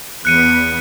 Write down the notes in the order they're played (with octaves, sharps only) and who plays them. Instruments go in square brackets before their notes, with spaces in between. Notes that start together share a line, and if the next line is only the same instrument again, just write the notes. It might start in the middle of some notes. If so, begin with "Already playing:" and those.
[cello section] E2 B3 [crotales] F#6 C#7 D#7